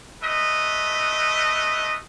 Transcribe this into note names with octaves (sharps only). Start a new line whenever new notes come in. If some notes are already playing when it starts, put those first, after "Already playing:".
A3 B4 D#5